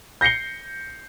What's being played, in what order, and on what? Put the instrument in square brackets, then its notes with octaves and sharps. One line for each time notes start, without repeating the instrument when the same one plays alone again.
[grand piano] G6 A#6 C7 C#7 G7